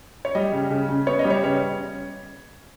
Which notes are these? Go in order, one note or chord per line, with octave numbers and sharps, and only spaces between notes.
C#5
G3 D#5
C#3
C#3
C#3
B3 C#5
D#5
G3
C#5
C#3 C#5